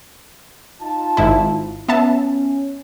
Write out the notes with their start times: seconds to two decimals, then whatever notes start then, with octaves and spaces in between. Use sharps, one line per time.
0.81 D#4 F4 A5
1.17 G#1 G#2 E4
1.89 B3 C#4 E5 A5